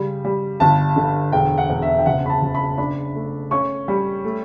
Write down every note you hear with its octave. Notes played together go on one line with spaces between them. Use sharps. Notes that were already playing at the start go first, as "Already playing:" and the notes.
Already playing: C#3 G3
G3
G1 A5
D3
E1 G5
F#5
E1
E5
G5
F#1 F#5
B5
A5
F#1
B5
D4 B5
A3
C#4 C#6
G3
A3